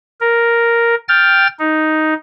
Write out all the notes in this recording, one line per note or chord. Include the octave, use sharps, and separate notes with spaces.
A#4
G5 F6 A6
D#4